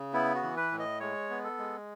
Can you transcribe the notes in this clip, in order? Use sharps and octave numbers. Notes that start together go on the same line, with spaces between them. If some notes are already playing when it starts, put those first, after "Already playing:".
Already playing: C#3
B3 E4
F#4
E3
B4
A2
D#5
G#3 C#5
B3
A4
G#3